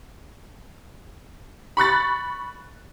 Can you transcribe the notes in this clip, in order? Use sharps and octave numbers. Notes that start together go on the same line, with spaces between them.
B5 C#6 F#6 A6